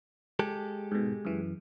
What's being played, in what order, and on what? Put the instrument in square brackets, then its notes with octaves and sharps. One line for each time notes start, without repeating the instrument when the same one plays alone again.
[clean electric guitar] G#3 G4 A4
[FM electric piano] G#2 B2
F#2 E3